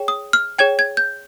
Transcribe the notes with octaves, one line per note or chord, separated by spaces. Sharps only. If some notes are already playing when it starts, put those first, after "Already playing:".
Already playing: G#4 C#5 G5
D#6
F6
G#4 C#5 G5 G#6
G#6
G6